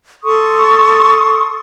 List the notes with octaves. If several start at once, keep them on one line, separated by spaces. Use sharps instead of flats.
A4 C6 C#6 D#6